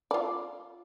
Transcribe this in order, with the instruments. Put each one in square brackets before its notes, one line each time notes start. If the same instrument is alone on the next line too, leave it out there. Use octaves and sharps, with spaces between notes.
[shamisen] F4 D5